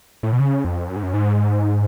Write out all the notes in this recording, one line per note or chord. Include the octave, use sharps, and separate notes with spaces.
A2
B2
C#3
F2
F#2
G#2
F#2
G#2